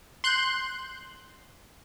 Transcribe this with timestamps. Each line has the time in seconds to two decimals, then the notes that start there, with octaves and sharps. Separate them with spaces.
0.24 C6 F#6 G6